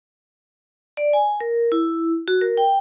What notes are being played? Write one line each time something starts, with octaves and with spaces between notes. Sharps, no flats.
D5
G#5
A#4
E4
F#4
A#4
G5